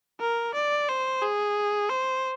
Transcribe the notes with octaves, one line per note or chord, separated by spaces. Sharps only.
A#4
D5
C5
G#4
C5